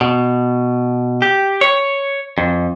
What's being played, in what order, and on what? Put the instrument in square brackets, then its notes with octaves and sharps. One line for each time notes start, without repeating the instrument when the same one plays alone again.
[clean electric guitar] B2
G4
C#5
F2